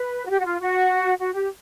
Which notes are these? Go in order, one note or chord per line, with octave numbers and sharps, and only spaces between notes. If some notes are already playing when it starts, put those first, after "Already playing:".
Already playing: B4
F#4
G4
F#4
F4
F#4
F#4
G4